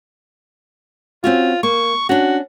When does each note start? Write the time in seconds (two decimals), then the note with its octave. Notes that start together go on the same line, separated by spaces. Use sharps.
1.24 C4 C#4 F4 F#4
1.63 A#3 C#6
2.09 C#4 D4 F#4